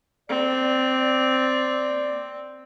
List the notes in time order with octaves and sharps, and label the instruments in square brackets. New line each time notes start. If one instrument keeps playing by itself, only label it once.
[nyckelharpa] C4 [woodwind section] D5